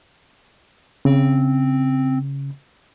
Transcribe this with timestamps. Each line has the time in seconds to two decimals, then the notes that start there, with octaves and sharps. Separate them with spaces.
1.05 C#3 C4